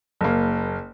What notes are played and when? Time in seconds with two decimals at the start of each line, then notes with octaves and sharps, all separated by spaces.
0.21 F#1 A#3